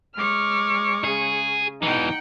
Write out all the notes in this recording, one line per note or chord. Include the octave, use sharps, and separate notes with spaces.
G#3 C#5 D6 F6
C#3 G#4
B2 E3 D#4 F#5 G5